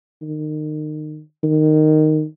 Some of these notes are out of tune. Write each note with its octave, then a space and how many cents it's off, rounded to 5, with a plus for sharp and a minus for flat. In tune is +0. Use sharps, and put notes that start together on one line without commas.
D#3 -30
D#3 -10